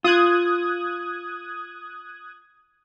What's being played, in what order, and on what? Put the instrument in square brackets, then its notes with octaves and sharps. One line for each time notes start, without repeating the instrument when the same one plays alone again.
[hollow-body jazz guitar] F4 [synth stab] D#6 F#6 G#6